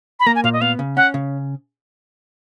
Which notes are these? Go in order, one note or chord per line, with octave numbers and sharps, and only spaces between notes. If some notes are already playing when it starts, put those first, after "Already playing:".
B5
A#3 A#5
G#5
A#2 F5
D#5
B3 F5
C#3
C#4 F#5
C#3